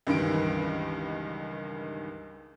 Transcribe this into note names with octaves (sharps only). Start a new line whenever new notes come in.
C#2 G2 D#3 E3 D7